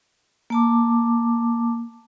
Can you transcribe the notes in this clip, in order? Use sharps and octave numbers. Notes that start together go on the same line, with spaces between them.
A#3 A5 D6